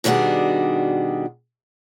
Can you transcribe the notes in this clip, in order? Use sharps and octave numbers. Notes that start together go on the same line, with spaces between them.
B2 D#3 G3 D4 F#4 G#4